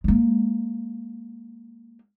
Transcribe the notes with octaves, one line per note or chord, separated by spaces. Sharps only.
G#3 A#3